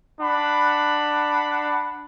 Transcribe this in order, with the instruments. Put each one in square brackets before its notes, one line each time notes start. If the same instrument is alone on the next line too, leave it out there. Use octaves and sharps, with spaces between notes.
[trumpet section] D4 F#5 B5